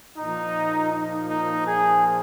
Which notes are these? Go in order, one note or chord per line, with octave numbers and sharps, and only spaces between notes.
A#2 F3 A#3 D#4
D#4
D#4
G#4